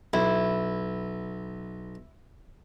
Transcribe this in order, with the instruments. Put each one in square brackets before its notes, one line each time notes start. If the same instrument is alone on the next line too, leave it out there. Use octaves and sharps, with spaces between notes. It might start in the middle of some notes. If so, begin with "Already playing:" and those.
[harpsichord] B1 [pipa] E4